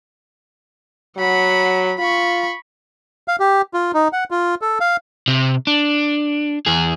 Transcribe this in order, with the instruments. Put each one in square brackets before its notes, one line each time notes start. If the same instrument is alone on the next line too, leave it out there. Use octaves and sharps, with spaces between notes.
[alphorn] F#3 [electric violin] F#5 B5
[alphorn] F4 [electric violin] B5 C#6
[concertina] F5
G4
F4
D#4
F#5
F4
A4
F5
[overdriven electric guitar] C3
D4
E2 G#4